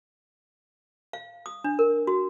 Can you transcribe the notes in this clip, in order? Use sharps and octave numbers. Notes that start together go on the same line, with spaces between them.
F5
D#6
D4
A#4
F#4